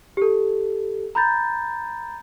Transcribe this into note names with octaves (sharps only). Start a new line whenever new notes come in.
G4 A4
A#5 B5 G6 A6